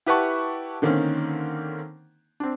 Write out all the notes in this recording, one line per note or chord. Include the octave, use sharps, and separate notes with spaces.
E4 G4 B4 F#5 A5 C#6
D3 D#3 A#3 C4 C#4
C4 D4